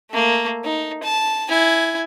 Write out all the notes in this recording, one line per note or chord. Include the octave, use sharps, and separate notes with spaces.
A3 A#3
D#4
A5
E4 G#5